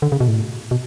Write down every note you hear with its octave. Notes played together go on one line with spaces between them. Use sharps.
D3
C#3
B2
A2
B2